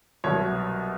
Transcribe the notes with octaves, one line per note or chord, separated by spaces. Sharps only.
C2 B2 F#3 C#5